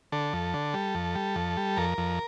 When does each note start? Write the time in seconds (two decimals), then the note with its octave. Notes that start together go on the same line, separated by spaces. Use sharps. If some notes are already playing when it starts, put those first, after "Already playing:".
0.12 D3 A4
0.33 F2
0.54 D3
0.74 G3
0.95 F2
1.15 G3
1.36 F2
1.57 G3
1.77 F2 A#4
1.98 F2